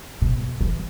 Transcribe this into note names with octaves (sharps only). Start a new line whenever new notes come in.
B2
E3